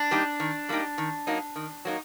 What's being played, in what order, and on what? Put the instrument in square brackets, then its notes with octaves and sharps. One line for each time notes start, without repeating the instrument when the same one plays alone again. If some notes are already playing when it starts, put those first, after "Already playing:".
Already playing: [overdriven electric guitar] D4
[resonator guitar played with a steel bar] G3 A#3 D#4 G4
D#3
G3 A#3 D#4 G4
D#3
F#3 A#3 D#4
D#3
F#3 A#3 D#4